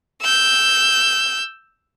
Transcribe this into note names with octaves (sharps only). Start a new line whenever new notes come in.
E6 G6